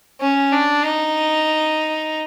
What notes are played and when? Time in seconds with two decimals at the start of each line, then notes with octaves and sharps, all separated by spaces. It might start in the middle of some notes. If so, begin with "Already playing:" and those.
0.21 C#4
0.52 D4
0.84 D#4